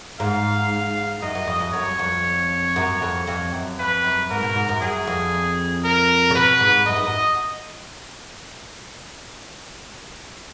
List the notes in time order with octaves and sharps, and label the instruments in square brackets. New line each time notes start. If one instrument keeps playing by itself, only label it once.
[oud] G#2 [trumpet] F5
[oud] F#2 [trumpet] D#5
[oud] F#2
F2
F2
[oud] F#2 [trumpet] C#5
[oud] F2
F#2
F2
F2
F#2
[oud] F2 [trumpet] B4
[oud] F#2
[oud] G#2 [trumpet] A#4
[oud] B2
G#2
F#2
[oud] F#2 [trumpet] G#4
[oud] F2
[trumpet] A#4
[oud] C#3
[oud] B2 [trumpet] B4
[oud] G#2
[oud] F#2 [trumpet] D#5
[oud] G#2
F#2